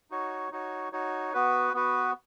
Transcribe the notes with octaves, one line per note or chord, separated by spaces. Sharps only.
D#4 F#4 C#5
D#4 F#4 C#5
D#4 F#4 C#5
B3 F#4 B4
B3 F#4 B4